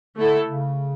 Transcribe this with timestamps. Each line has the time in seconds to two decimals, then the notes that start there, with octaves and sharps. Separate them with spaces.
0.17 D3 A3 E4 A4
0.46 C#3